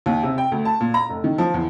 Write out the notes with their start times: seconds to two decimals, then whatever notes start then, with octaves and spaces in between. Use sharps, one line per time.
0.06 D#2
0.23 C3
0.38 G5
0.52 D2
0.65 A5
0.81 A#2
0.94 A#5
1.10 F1
1.24 D#3
1.38 F3
1.54 E2